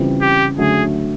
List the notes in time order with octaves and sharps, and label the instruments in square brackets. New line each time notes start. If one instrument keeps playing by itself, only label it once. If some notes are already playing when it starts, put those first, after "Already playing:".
Already playing: [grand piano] C#3 E3 G3 C4 F4
[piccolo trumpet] G4
[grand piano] D3 F#3 A3 C#4 [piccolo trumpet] G#4